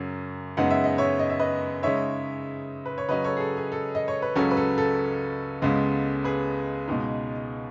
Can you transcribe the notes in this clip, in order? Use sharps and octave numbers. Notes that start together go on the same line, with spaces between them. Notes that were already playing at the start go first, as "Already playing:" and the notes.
Already playing: F#2 C#3 F#3 C#4
F#2 C#3 G#3 B3 D#4 F#5
E5
D#5
C#5 E5
D#5
E5
B4 D#5
C#3 G#3 D#4 C#5 E5
B4
C#5
C#3 F#3 C#4 B4 D#5
A4 C#5
G#4
A4
G#4
A4
D#5
C#5
B4
C#2 C#3 F#3 C#4 A4
B4
A4
A4
C#2 C#3 G#3 B3
G#4 B4
C#2 B2 G#3 D#4